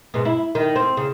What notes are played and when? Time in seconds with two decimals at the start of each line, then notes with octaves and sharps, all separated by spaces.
0.14 G#2 B2
0.25 E4
0.55 D#3
0.76 C4
0.97 C#3